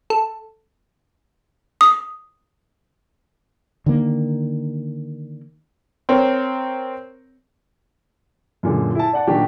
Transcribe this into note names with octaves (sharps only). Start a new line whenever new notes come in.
A4
D#6
D3 D#3 A#3
C4 A#4 C#5
F#2 A#2 D3 G#3
E4 A5
D5 F#5 A5
A#2 D#3 F#3 D4 F#4 G4